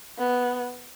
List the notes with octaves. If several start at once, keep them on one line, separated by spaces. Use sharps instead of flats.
B3